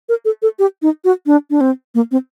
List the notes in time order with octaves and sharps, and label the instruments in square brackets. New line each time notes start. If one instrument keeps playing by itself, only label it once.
[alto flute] A#4
A4
A4
G4
D#4
F#4
D4
D4
C4
A#3
C4